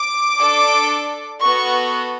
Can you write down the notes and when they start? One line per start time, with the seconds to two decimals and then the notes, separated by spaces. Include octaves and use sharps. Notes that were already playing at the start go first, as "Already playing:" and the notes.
Already playing: D6
0.39 D4 A4
1.42 B3 F#4 A4 C#6